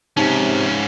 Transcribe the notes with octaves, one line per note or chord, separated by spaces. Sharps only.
G#2 C3 C#4 D#4